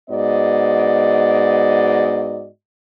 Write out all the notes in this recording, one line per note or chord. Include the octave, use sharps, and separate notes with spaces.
G#2 B3 F#4 D5 D#5